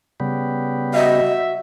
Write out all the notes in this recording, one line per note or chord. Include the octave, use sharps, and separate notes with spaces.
C#3 G3 B3
F#4 D#5 E5